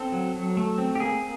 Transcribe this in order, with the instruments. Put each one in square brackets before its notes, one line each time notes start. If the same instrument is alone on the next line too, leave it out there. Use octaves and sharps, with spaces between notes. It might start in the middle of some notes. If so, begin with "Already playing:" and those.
Already playing: [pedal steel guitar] C4 A4
F#3
F#3
A3
C4
G4
A#3 G#4